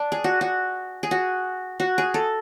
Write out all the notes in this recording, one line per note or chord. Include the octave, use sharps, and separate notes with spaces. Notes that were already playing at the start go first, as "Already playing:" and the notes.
Already playing: D4
G#4
F#4
F#4
G#4
F#4
F#4
G#4
A4